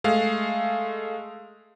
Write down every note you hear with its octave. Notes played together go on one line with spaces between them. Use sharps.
G#3 A3 F5